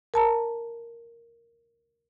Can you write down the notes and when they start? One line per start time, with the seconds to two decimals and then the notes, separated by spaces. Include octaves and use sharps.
0.14 A#4 A5 A#5